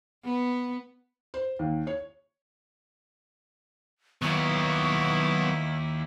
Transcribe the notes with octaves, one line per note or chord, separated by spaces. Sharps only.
B3
C5
D#2
C#5
D#2 F#3 B3 E4 C#6